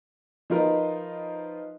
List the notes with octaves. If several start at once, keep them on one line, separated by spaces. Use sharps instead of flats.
F3 D#4 F4 A#4 B4 D#5